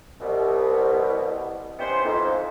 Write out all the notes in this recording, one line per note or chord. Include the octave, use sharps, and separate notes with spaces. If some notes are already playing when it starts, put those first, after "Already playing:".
C2 B2
D#3 B3 C#4 E4 G4 C5
F2 G#2